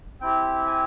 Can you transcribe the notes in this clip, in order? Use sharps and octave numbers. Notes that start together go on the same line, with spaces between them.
C4 E4 G4 G5
G#5